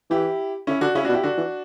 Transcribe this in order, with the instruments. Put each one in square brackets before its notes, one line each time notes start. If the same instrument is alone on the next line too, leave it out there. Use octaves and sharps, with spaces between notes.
[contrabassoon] E3 [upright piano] E4 G4
[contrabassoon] D3 [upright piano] C#4 E4
[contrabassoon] D3 [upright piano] D4 F#4
[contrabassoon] C#3 [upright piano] C#4 E4
[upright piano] D4 F#4
[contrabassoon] B2
[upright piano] E4 G4
[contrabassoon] D3 [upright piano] D4 F#4
[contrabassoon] E3